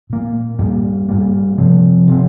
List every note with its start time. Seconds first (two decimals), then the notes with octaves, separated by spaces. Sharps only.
0.10 A#2 A#3
0.59 G2 G3 A#3
1.09 G2 G3 A#3
1.58 C3 F3 C4
2.07 C3 F3 C4